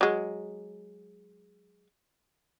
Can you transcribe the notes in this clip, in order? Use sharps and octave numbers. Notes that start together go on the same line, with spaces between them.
F#3 G#3